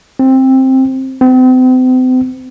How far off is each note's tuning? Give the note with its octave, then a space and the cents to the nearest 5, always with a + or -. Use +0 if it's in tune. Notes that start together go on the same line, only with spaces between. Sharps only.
C4 +10
C4 -40